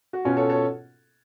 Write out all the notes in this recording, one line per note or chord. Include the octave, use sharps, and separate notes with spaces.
F#4
B2 C#4 F4
A4 C#5
A4 C#5